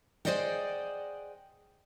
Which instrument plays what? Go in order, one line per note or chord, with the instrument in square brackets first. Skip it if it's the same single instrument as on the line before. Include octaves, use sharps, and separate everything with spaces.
[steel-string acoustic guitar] G#4 C5 D5 D#5 F#5 G5